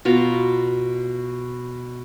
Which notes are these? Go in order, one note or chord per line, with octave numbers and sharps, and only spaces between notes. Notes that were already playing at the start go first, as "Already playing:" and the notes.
B2 F4 A#5